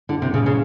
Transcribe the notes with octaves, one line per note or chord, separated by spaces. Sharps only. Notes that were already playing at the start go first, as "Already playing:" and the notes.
D3 E4
C3
A#2
C#3
G3
C#3